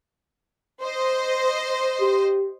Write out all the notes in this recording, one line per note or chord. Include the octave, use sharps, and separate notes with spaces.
C5 D#5
G4